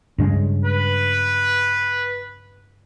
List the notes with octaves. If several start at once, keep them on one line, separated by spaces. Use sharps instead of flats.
G2 C#3 G#3
B4